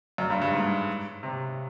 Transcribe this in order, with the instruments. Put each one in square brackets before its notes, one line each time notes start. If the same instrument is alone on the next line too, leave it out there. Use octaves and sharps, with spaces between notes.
[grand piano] F#2
G2
G2
G#2
C3